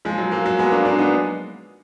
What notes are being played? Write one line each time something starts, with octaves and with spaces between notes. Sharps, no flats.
F3 G#3
F#3
F#3 A#3
F#3 A#3
G#3 B3
A#3 D4
A#3 D4
B3 D#4